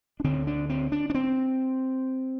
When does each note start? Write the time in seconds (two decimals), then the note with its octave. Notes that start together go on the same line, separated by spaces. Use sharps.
0.20 D4
0.24 D2 D3 C4
0.47 D4
0.69 C4
0.92 D4
1.10 D4
1.15 C4